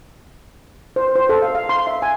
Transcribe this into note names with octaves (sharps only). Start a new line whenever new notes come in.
C5
C5
A4
F5
F5
C6
E5
G#5